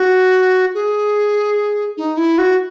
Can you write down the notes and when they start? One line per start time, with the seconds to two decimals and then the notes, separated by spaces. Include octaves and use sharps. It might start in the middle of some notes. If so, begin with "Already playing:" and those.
Already playing: F#4
0.75 G#4
1.97 D#4
2.17 E4
2.38 F#4